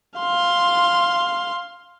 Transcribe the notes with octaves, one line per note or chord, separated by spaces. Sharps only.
F5 C6